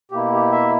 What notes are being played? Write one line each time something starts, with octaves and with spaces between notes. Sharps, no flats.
B2 A#3 E4 G4
G4
E5